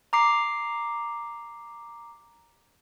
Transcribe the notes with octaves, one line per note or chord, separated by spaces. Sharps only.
A#5 D6 C7